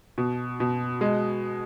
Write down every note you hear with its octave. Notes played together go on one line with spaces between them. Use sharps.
B2
B2
G#3